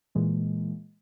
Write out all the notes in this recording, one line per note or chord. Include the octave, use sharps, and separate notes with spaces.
A#2 E3 G#3 A#3